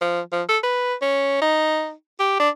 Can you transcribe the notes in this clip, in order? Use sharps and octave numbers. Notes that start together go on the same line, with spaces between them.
F3
F3
A4
B4
C#4
D#4
G4
D4